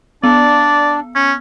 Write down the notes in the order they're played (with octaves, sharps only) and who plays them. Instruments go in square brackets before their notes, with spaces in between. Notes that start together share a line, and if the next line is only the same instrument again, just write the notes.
[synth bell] B3 [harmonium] D4 [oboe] D5
[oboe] C#4